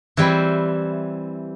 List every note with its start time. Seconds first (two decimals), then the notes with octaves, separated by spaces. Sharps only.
0.17 E3 G3 C4 E4